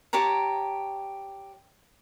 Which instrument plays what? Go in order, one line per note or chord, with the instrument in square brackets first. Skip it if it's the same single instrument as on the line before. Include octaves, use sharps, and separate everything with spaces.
[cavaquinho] G4 C#5 A5 A#5